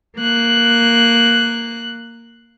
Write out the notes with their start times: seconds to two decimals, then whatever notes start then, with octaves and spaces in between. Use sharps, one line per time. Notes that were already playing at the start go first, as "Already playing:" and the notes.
0.18 A#3 F#6